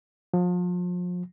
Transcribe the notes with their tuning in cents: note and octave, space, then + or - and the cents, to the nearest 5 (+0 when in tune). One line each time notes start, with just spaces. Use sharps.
F3 +35